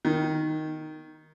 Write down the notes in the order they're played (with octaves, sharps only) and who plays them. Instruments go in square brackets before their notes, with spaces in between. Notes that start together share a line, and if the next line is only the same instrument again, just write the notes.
[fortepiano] D#3